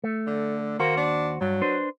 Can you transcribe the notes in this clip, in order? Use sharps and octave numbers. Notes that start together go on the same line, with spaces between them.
A3
D3
D#2 A#3 F#4 C5
D4
G2 F#3
D4 B4 C5